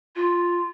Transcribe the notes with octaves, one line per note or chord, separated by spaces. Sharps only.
F4